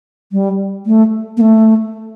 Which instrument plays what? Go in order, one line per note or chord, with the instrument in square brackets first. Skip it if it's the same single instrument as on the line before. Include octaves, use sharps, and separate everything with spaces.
[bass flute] G3
A3
A#3
A3